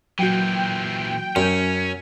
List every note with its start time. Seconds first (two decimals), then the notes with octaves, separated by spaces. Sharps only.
0.19 A#2 E3 F#3 F#4 G5
1.36 F#2 C#4